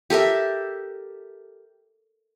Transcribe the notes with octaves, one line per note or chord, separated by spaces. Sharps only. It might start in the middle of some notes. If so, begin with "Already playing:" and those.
G4 A4 A#4 E5